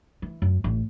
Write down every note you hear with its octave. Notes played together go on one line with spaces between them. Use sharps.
E3
F#2
A1